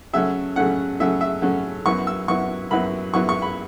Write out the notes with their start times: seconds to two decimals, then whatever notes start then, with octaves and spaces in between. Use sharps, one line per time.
0.13 C#3 F#3 A3 C#4 E5
0.56 C#3 F#3 A3 C#4 F#5
1.00 C#3 F#3 A3 C#4 E5
1.21 E5
1.42 C#3 F#3 A3 C#4
1.85 F#2 F#3 B3 E4 C#6
2.07 E6
2.28 F#2 F#3 B3 E4 C#6
2.71 F#2 F#3 B3 E4 B5
3.13 F#2 F#3 B3 E4 C#6
3.29 C#6
3.42 B5